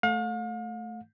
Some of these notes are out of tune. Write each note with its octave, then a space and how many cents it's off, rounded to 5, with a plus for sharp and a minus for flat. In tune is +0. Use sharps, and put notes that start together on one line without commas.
A3 -5 F5 +40